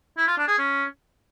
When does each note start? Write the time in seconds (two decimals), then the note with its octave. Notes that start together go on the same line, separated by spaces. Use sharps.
0.17 E4
0.27 F4
0.38 D4
0.48 G#4
0.58 C#4